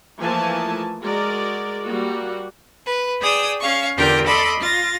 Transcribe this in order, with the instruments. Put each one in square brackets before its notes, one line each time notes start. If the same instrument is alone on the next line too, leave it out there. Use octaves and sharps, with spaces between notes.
[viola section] E3 F3 A3 A#3 G#5 A5
G#3 F#4 A#4 D5
G3 A#3 F#4
[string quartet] B4
G#4 D5 G5 D#6 E6
C#4 F5 C#6
E2 D3 F4 G4 A#4 G5
A4 D5 D#5 B5 C6
F4 A6 A#6